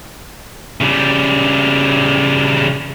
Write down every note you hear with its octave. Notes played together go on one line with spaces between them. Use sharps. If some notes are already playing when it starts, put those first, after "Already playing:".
C#3 G3